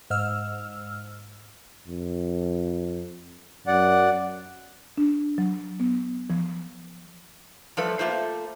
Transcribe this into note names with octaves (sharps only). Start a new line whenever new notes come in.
G#2 E6 F6
F2
F#2 D5 F#5
D4
F#3
B3
F3
F3 G3 A3 A4 B4
A3 A#3 F4 C5